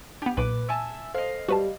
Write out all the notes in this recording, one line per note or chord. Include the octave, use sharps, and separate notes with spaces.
B3 D4 G4
B1 A#2 B4 D6
E5 G#5 A5 E6
A4 C5 D#5 F5
G3 F#4 B4 A5